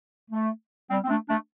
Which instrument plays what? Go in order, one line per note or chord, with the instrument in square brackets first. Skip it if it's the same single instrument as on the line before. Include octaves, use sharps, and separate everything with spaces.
[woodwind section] A3
G3 C4
C4
A3 D4
A3 D4